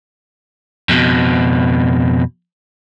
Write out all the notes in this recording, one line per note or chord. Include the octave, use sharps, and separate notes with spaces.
F2 B2